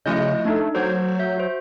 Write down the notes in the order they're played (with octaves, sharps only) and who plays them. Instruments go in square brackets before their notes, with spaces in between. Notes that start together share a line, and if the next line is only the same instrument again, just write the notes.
[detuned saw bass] C#3 [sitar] F3 E4 D#5 [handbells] A3 G6
[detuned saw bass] A3 [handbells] D4 D#4 A4
[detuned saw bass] F#3 [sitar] A3 [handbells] C5 G6 G#6
[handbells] E5 G6
F#4 C5